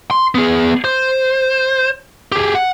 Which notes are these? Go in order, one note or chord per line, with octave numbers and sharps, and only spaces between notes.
C6
B3 G#4
C5
G4 G#4
F#5